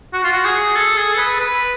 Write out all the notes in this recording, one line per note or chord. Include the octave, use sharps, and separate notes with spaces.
F#4
F4
F#4
G#4
A4
G#4
A4
B4
B4